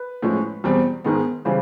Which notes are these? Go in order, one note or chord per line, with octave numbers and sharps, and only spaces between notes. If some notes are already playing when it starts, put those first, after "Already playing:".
Already playing: B4
A2 F3 G#3 C#4
E2 B2 G3 C4
G#2 D#3 G#3 B3
C#3 E3 G3 C5